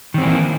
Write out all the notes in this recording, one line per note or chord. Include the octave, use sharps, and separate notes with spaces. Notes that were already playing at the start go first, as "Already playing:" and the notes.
D#3 E3 A#3 C4